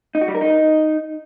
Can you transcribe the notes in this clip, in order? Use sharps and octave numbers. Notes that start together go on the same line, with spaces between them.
D#4
F#4
G3
A#4
D#4